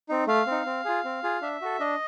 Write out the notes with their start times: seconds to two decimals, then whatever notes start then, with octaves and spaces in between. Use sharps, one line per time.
0.09 C4 D#4
0.27 A3 F5
0.47 C4
0.52 D#4
0.66 C4
0.85 F4 G#4
1.04 C4
1.23 F4 G#4
1.42 D4 E5
1.61 F#4 A4
1.80 D4 D#5